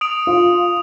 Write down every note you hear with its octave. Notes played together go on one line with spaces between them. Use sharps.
D#6 D7 F7
F4